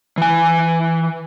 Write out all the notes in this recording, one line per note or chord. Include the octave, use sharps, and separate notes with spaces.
E3 G#5